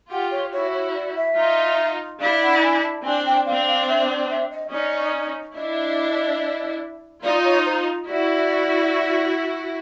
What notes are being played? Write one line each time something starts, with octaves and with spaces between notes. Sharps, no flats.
F4 G4 F#5
C#5
E4 F#4 C#5
C#5
D5
E5
D#4 F4
D4 E4 F5
F#5
G#5
A5
C4 D4 G#5
G5
C4 D4 F5
F5
E5
D5
E5
D#5
C#4 D#4 D5
D4 E4 D#5
D#4 F4 D5
C#5
C5
E4 F#4 D5